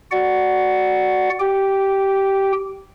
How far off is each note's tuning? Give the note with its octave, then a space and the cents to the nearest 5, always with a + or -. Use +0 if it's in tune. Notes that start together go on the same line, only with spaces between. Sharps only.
F#4 +5 D5 +0 F#5 +5
G4 -15 G5 +0